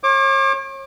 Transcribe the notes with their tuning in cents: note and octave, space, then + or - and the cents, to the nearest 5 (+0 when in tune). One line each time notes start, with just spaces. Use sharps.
C#5 -40 D6 +15